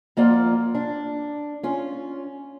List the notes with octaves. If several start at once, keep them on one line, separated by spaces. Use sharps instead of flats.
F2 A#3 F4 D5 F#5
D4
C#4 F4